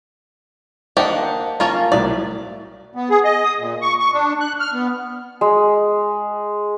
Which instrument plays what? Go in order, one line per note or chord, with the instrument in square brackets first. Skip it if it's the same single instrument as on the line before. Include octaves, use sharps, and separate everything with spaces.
[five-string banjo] A#3 D4 G4 [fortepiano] C5 D#5 F#5
[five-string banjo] A#3 C#4 F4 [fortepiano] F5 A5 A#5
[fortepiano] C2 A2 F#3 [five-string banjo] D5
[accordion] B3
G#4
D#5
D#6
A#2
C#6
C#6
D4
F#6
F6
B3
[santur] G#3